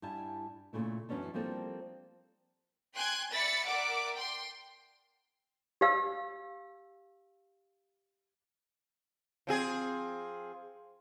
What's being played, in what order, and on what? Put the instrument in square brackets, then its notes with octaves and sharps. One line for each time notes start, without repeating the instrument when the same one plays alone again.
[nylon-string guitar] G2 G3 E4 G#5 A5
A#2 C#3 A3 E4
F#2 E3 B3 C#4 D4
F3 G3 A#3 C4 A4
[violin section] G5 G#5 C6 F#6 G#6
D5 E5 B5 A6 C#7
A#4 D5 E5 F#5 D6
G5 C6
[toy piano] G4 F5 E6
[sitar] F3 C4 G#4